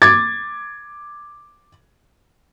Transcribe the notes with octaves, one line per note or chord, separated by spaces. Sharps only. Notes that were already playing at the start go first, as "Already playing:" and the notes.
D6 G#6 A6